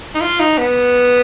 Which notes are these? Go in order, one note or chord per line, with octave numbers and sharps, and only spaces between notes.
D#4
F4
D#4
B3